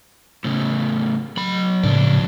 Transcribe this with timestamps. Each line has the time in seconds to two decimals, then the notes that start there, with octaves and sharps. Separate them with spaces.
0.44 A2 C#3
1.37 F#3 B5
1.83 F2 A2 C#3 D4